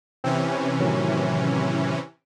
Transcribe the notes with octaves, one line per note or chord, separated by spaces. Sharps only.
C3 E3 C4 C#4
A2 D#3 F#3